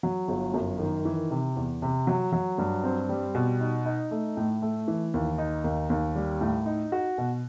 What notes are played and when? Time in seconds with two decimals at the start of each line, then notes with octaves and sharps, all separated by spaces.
0.03 F#3
0.28 G1
0.54 F#2
0.79 D#3
1.05 E3
1.31 C3
1.56 E2
1.82 C3
2.07 F#3
2.32 F#3
2.58 G2
2.83 C4
3.09 G3
3.35 B2
3.60 D#4
3.85 D#4
4.11 A3
4.37 A2
4.62 A3
4.88 E3
5.14 D#2
5.38 D#4
5.64 D#2
5.90 D#2
6.15 G3
6.41 A2
6.66 D#4
6.92 F#4
7.18 B2